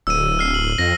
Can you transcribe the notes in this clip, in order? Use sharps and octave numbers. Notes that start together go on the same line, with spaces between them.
D1 E6 D#7
F6 C7
F#7
F2 A#6